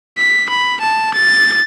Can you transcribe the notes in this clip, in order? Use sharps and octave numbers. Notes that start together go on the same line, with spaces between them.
B6
B5
A5
A6